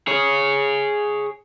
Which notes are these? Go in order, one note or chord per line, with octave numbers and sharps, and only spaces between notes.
G#4 C#5